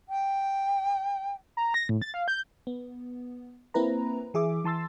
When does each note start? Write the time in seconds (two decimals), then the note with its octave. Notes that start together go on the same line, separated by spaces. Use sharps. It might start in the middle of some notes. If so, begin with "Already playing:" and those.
0.09 G5
1.57 A#5
1.74 A#6
1.89 A2
2.02 A6
2.14 F5
2.28 G6
2.67 B3
3.74 A#3 C4 E4 B4 A#5
4.34 E3 G#4 E5 D6
4.64 E3 A5 C6 E6 A6